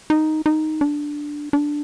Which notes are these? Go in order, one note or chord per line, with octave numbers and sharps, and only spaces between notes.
D#4
D#4
D4
D4